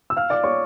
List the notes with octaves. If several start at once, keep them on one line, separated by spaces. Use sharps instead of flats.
E6
F5 F6
D5 D6
C#5 C#6